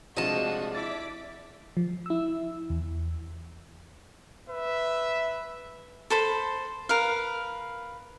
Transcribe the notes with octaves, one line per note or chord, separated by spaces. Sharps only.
C3 F3 G#3 A3 D4 F#4 D#5 A5
E4 D5 D6 A6 B6
F3
E4 E6
E2
B4 E5
A4 C5 B5
A#4 B4 F5